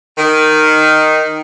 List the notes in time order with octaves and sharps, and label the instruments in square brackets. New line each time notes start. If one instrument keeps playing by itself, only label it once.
[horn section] D#3